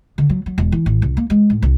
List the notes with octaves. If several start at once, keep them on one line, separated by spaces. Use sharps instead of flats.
D3
F#3
F#3
E1
E3
A1
C2
A#3
G#3
A2
C2